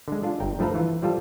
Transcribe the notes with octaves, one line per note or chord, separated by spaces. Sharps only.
D3 G#3
D4 F4
G1 G5 A#5
G2 F3 A3 A4 B4 A#5
E3 F4
F3 G3 F4 A4